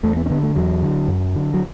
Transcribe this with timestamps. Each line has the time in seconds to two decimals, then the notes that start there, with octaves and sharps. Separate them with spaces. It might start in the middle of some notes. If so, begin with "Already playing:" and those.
0.03 E2 A3
0.17 B3
0.26 C#4
0.30 D3 B3
0.43 A3
0.56 E2 F#3
0.82 D3
1.08 F#2
1.35 D3
1.54 F#3